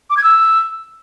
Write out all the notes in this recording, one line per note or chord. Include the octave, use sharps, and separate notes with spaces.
D6
G#6
E6